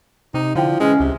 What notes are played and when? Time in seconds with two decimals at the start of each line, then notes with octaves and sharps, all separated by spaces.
0.34 C3 D#4
0.55 D3 F3 E4 G5
0.80 E3 G#3 C#4
1.00 C#2 C3